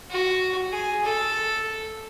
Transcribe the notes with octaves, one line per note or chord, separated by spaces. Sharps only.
F#4
G#4
A4